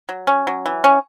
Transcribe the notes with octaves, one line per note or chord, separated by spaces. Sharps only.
F#3
C#4
F#3
E3
C#4